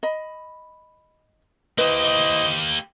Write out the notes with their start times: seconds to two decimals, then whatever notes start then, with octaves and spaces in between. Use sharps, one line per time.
0.03 D#5 B5
1.78 A#3 E4 G4 B4 C5 D#5